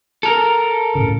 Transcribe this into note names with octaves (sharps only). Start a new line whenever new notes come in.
A4 A#4
A2 C#3